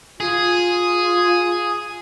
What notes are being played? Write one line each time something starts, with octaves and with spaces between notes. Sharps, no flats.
F4 G#4